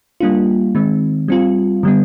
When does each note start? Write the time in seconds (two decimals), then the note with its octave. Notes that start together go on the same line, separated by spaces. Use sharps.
0.20 G3 A#3 D4 F4
0.75 D#3 G#3 C4
1.28 G3 C4 F4
1.83 D3 G3 B3